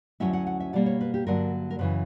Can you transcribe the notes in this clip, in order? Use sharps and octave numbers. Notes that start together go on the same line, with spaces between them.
D2 C#3 F#3 C#4 E4 E5
F#5
F#5
E5
B2 G3 A#3 D5
C#5
B4
G4
G2 D3 F#3 A#3 A#4
A#4
F#2 C#3 E3 B4